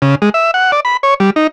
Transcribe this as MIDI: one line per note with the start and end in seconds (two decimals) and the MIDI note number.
0.02 0.15 49
0.22 0.29 56
0.34 0.51 76
0.54 0.71 78
0.72 0.80 74
0.85 0.97 83
1.03 1.14 73
1.20 1.30 55
1.36 1.47 63